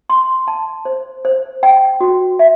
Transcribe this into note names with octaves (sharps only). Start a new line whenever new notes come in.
C6
A5
C5
C5
G5
F#4
E5